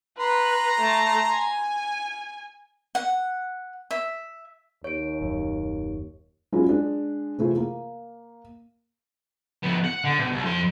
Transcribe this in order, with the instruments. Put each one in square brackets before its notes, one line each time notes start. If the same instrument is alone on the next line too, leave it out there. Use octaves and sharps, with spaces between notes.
[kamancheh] B4 [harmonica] A#5 C6
[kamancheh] A3 A5
G#5
[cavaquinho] F#5
E5
[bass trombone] D#2 [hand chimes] C#5 D7
[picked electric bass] D#1 F#2
[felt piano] F#3 G#3 C#4 E4 F4
G#3 D4
C3 E3 A3 F4 G#4
A#3
[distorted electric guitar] F2 B3
F#5
D3
B2
C2
F2 C6